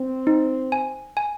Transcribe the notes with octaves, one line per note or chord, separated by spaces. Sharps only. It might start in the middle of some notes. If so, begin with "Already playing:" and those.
Already playing: C4
D#4
G#5
G#5